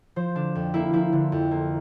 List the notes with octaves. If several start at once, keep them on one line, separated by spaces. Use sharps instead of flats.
F3 C5
D3 D4
F2
A#3 E4
F3 E4
D3
F2
A#3